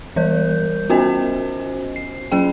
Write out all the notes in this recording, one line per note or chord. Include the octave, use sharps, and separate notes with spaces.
E3 G3 A#4 G6
B3 C#4 F#4 C5 D#5 G#5
C7
F#3 C#4 G#4 G5